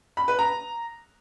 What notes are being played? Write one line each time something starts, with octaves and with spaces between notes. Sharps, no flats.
B5
B4
A#5